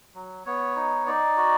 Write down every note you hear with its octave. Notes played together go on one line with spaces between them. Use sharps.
F#3
B3 C#5
D#4
D#4 D5
F#4